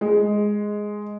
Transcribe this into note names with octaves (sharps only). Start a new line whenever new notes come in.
G#3